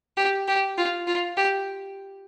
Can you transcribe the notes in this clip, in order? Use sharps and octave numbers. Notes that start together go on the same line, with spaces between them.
G4
G4
F4
F4
G4